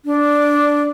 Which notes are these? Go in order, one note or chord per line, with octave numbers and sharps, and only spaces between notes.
D4